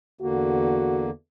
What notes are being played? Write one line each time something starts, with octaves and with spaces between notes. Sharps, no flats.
E2 D3 A#3 F#4